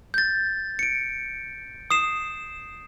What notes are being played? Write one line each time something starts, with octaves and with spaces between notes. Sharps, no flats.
G6 A6
C#7 D7
D#6 C7 E7